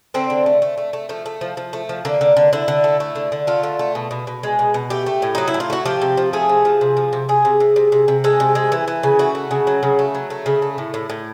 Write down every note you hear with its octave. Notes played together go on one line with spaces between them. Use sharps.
D3 C4
D3
A3
A3
A3
A3
F3 A3
A3
F3
F3
A3
F3
D3 A#3
D3
D3
D3 E4
D3
A3
A3
D3
D3
A3 F4
D3
A3
B2
B2
B2
G#3
B2
B2
A3 G4
A3
A2
F#3 D#4
E4
A2
F4
A3 F#4
F3 G4
C3
F3
A3 G#4
C3
F3
C3
F3
C3
C3 G#4
C3
C3
C3
C3
C3
G#3 A4
C3
G#3
E3
E3
C#3
A3 F#4
A3
C#3
F#3
C#3
A3
F#3
A3
C#3
A3
A2
A2
A2